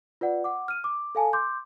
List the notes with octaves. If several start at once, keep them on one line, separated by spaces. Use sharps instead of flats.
F4 B4 D5 F#5
F#5 D6
F6 D#7
D6
A4 F5 G#5 A5
C6 D6 G6